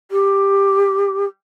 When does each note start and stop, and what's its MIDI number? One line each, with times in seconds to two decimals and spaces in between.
0.11 1.25 67